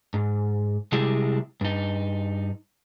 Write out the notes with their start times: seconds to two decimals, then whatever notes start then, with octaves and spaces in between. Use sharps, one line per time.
0.14 G#2
0.92 C3 G3 G#3 E4 G4
1.61 G2 D#4